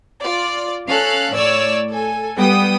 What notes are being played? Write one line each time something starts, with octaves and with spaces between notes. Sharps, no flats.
F4 D5
C#4 A4 F5 F#6
A2 C#5 D5 E6
A4 G#5
G3 B3 G5 D#6